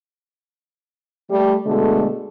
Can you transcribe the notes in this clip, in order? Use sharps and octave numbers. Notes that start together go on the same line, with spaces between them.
G3 A3
B2 D3 G#3 A3